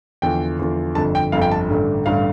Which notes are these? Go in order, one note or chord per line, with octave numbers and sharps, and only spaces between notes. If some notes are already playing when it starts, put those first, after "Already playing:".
E2 D3 F3 G5
E2 D3 F3
G1 F2 D3 A5
G5
G1 F2 D3 F5
G5
A5
A1 G2 D3 A3
A1 G2 D3 A3 F5